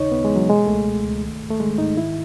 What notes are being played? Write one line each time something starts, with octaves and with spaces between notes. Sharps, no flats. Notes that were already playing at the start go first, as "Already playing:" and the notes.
Already playing: D#2 C#3 D#4 C#5
D#2 B3
G#3
E3
F#3
B2 G#3
C#2 A3
B2
C#2
D#3
G#2
A3
D#3 G#3
G#2 D#4
D#3 E4